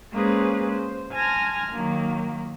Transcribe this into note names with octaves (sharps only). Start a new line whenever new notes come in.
G#3 A#3 C#4 G#4 B4 C5
C5
G#5 A5 C6 F6 G#6 A#6
D#3 F#3 A#3